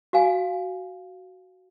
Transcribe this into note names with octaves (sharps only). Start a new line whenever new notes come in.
F#4 F5 G#5